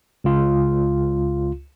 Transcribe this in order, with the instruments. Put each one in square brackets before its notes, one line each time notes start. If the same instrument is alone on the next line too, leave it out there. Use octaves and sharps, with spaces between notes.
[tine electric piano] C#2 F4